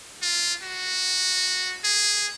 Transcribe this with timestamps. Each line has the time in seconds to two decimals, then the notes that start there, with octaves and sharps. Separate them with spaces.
0.22 F4
0.63 F#4
1.84 G#4